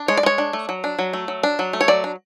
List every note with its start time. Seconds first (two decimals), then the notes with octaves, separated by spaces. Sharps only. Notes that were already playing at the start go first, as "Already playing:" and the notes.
Already playing: D4
0.08 G#3 C#5
0.17 D5
0.23 G#3 C#5
0.38 D4
0.53 A3
0.69 F#3
0.84 D4
0.99 F#3
1.13 A3
1.28 F#3
1.43 D4
1.59 F#3
1.73 A3
1.81 C#5
1.88 F#3 D5
2.04 D4